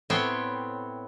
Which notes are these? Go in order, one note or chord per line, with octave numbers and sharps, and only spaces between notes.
A2 B3 C4 C5 C#5 G5